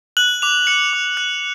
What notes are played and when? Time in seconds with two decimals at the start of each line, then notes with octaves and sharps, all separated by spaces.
0.17 F#6 F#7
0.42 D6 F7
0.67 F#6 C#7
0.93 D6
1.17 F#6